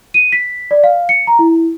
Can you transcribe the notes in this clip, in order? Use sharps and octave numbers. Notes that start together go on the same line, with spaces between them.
D#7
B6
D5
F5
C#7
A#5
E4